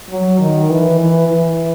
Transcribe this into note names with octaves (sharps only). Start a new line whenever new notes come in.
F#3
D#3
E3
E3
E3